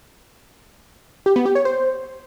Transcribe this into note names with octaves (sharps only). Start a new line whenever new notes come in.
G4
B3
G4
C#5
C5